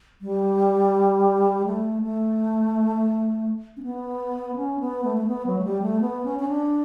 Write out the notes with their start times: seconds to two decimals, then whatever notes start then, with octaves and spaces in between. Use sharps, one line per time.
0.22 G3
1.66 A3
2.03 A3
3.77 C#4
3.83 B3
4.56 C#4
4.80 B3
5.04 A3
5.17 A3
5.27 B3
5.47 F#3
5.59 A3
5.65 G3
5.82 A3
6.01 B3
6.25 C#4
6.39 C#4
6.49 D4